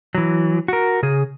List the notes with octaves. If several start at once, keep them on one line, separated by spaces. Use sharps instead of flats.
E3 F#3
F#4 A#4
C#3 G#4